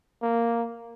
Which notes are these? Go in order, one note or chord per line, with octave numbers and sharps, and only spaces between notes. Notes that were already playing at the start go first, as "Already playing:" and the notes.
A#3